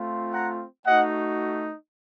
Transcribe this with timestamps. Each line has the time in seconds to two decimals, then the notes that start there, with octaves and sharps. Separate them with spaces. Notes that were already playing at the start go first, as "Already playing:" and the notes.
Already playing: A3 C4 F4
0.31 F#5 A#5
0.85 A3 D#4 F#4 D#5 F#5